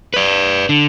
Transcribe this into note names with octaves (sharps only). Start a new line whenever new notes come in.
B4 D5
D3